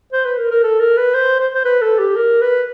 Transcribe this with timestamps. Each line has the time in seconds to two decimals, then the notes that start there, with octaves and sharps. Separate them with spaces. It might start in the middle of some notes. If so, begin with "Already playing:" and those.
0.13 C5
0.25 B4
0.38 A#4
0.51 A#4
0.63 A4
0.80 A#4
0.97 B4
1.14 C5
1.40 C5
1.54 C5
1.65 B4
1.82 A4
1.99 G4
2.16 A#4
2.41 B4